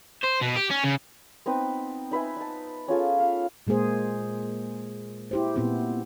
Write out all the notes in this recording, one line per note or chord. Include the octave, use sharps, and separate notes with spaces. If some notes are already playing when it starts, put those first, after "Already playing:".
C5
B2
G4
C#4
C#3
B3 C4 D#4 B4
D#4 B4 E5 G#5
D#4 A5
C#4 F4 G#4 A4
F5
A#2 G#3 A#3 G#4 C5
E4 G4 C5
A#2 B3 C4 G4